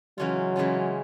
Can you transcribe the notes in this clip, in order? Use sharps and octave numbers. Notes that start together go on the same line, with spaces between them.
C#3 E3 F#3 G#3 C#4 F4
C#3 E3 G#3 C#4 F4